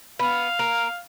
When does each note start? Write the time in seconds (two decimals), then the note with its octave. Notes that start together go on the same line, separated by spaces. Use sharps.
0.19 B3 F5
0.59 A#3